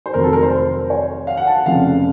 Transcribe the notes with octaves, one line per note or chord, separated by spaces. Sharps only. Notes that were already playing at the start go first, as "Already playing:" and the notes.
C5
F1 F2 D#3 F#3 A#4
A4
A#4
C5
C#5
F5
F#5
A5
F#5
F1 F2 C#3 F3 F5